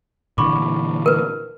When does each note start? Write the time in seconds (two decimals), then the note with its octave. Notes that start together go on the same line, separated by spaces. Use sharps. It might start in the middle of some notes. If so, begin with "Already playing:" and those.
0.38 A#2 D3 E3 B5 C#6 D6
1.06 A#4 B4